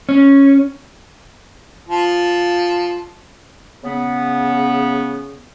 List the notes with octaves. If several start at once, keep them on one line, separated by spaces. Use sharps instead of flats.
C#4
F3
C#3 B3